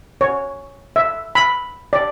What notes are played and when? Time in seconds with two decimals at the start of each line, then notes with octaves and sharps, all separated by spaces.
0.21 C#5
0.96 E5
1.35 B5
1.93 D5